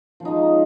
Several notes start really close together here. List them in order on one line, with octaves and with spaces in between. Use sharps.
F3 C#4 D#4 G#3